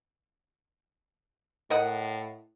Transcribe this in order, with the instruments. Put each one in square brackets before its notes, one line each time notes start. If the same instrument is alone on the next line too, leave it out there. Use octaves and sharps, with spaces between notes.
[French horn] A2 [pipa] A#4 D#5 F#5